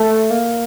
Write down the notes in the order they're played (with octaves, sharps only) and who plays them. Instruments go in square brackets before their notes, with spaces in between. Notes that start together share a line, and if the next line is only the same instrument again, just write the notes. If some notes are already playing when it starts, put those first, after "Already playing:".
Already playing: [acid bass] A3 [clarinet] A4
[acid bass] A#3